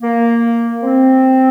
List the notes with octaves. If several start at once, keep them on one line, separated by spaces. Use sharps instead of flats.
A#3
C4